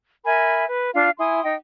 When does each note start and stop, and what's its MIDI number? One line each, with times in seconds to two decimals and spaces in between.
0.25 0.64 70
0.25 0.64 76
0.25 0.64 80
0.25 0.64 83
0.67 0.90 71
0.94 1.11 62
0.94 1.11 65
0.94 1.11 77
1.19 1.42 64
1.19 1.42 80
1.19 1.42 84
1.19 1.42 87
1.43 1.54 63
1.43 1.54 79